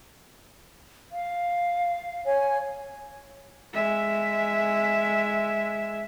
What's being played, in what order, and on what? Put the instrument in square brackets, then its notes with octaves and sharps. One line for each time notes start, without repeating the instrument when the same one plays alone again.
[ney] F5
[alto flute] C#5 [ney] G#5
[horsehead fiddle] G#3 E5